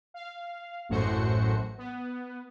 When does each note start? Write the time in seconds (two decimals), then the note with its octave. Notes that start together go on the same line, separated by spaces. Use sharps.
0.14 F5
0.89 A1 F#2 A2 F#4 C5 C#7
1.78 B3